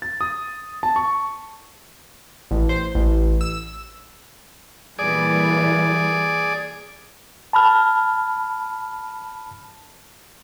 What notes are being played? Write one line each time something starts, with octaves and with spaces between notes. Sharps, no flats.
A6
D#6
A5
C#6
A1
C5
A1
E6
A#2 E3 G3 G#4 D5
A5 B5 F6